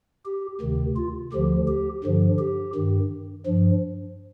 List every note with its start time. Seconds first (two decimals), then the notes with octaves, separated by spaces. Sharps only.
0.26 G4
0.61 D2 C3 D#3
0.96 F4
1.32 D2 D3 F3 G4
1.68 G4
2.04 G2 D3 F3
2.39 G4
2.75 G2 D#3
3.46 G2 F3